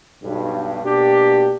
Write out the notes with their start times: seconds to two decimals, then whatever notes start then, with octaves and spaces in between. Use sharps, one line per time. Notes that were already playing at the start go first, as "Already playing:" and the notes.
0.22 B1 G2
0.83 B2 A#3 D4 F#4 G4